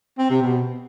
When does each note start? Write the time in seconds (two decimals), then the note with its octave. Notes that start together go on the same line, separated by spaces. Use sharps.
0.18 C4
0.30 C3
0.42 B2